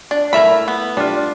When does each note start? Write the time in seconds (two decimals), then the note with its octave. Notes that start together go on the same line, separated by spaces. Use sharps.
0.11 D4
0.33 A3 E4 A#4 E5 B5
0.68 B3
0.97 G3 D4 F4